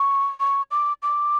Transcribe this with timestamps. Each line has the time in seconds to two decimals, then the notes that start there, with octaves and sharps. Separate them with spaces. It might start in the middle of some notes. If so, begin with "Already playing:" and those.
Already playing: C#6
0.40 C#6
0.71 D6
1.02 D6